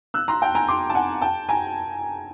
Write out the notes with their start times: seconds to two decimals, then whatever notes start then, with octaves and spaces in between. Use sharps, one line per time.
0.14 E6 F#6
0.28 A#5 C6
0.42 G5 A5
0.55 G#5 A#5
0.68 C6 D6
0.90 A5
0.95 F#5 G#5
1.21 G5 A5
1.49 G#5 A#5